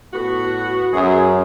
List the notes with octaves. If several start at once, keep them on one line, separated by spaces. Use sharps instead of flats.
A2 B3 F#4
F#2 G#4